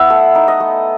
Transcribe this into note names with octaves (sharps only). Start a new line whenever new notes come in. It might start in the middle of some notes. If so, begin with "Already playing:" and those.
Already playing: B3 E4 E5 F#5
A3
D#4
D#5
A3